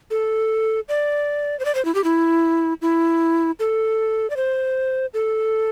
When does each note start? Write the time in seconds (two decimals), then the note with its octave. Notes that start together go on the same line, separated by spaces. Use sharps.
0.11 A4
0.89 D5
1.60 C5
1.65 D5
1.75 C5
1.85 E4
1.95 G4
2.04 E4
2.82 E4
3.60 A4
4.30 D5
4.36 C5
5.14 A4